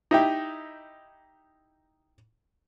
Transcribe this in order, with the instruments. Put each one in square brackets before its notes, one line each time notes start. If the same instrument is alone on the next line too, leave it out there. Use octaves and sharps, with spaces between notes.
[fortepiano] D#4 E4 G4